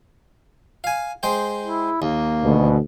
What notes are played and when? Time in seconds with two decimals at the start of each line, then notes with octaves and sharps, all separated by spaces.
0.84 F5 G#5
1.23 G#3 C5 G5
1.63 E4
2.02 D#2 A#3
2.43 D2 B2